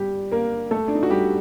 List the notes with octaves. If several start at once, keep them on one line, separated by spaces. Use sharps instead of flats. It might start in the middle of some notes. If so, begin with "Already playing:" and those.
Already playing: G3 G4
A#3 A#4
A3 A4
D4
D#4
F#4
G3 G4